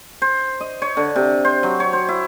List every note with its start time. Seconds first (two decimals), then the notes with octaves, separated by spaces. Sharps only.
0.22 C5
0.61 D#5
0.82 C#5
0.97 D3
1.16 C3
1.45 C5
1.63 F#3
1.80 C#5
1.93 C5
2.09 E4